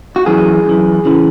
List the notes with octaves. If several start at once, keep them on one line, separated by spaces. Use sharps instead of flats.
F#4
F#2 E3 G#4
F#2 E3
C#3 E3